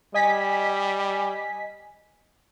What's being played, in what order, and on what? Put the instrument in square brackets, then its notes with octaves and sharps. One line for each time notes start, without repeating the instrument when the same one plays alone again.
[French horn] G3 [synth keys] D#5 G#5 B6